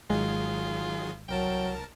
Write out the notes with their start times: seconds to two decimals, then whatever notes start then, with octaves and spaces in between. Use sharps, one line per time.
0.10 G#1 D#3 F#3 G#3 F4 G#4
1.29 C2 F#3 A#4 G5 A5